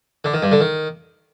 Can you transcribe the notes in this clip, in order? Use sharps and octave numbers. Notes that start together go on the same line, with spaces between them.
D3
D#3
G2
D3
D#3